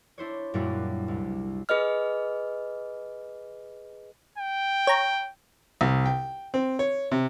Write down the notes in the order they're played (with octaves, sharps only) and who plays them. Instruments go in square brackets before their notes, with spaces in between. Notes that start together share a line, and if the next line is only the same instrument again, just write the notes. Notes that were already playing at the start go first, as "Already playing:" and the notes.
[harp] D4 E4 C5 C#5
F#2 A#2 G3 D4 E4 F#4
C2
[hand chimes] G#4 B4 D#5 F6
[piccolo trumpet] G5
[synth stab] C#5 A#5
[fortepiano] C2
G5
C4
C#5
C3